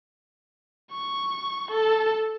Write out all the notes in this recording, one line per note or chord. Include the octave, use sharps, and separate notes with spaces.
C#6
A4